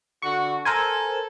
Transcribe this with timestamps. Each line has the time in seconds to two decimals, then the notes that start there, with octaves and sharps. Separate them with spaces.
0.22 D3 F#4 C#6
0.65 A4 A#4 C5 G#5